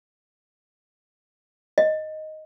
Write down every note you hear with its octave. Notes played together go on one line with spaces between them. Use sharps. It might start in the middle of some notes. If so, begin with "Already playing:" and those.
D#5